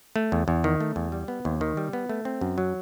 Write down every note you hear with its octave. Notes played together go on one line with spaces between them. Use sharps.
A3
E2
E2
D#3
A3
E2
G3
B3
D#2
D#3
G3
B3
A3
C4
F#2
F#3